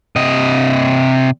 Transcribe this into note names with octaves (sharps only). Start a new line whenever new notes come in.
C3 D#5